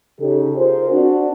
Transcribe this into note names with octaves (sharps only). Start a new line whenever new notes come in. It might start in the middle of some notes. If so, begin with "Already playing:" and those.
C#3 D#4 G4 A4
F4 G#4 A#4 C5
C4 D4 F#4